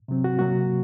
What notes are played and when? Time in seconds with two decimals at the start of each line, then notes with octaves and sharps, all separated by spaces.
0.08 C3 F#3 C4
0.24 F#4
0.39 C3 F#3 A#3 F#4